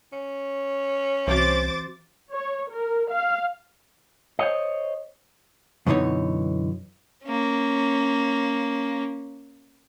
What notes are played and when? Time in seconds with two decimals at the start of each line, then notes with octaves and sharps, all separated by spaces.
0.13 C#4
1.27 C2 E3 C4 F#4 C5 D6 A6
2.31 C#5
2.71 A#4
3.12 F5
4.39 C5 C#5 D#5
5.86 F#2 B2 D3 E3 D#4 C#5
7.25 A#3 C#4